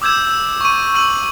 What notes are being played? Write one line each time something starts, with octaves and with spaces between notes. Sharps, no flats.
D6 E6 G6 G#6 E7
E6
C#6 D#7
E6 D#7 F#7